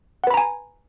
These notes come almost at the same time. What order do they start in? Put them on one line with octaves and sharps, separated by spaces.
F#5 B4 B5 A#5 G#5